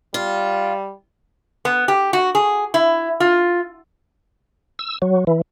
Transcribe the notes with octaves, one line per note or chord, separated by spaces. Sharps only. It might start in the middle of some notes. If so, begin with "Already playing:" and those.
G3 F4
B3
G4
F#4
G#4
E4
F4
E6
F#3
E3